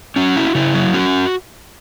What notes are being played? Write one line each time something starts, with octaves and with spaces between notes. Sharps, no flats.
C#4 F#4
E4
C#3 E4
F#3
C#4 F#4